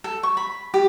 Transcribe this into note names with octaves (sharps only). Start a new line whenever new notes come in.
A4
C#6
B5
G4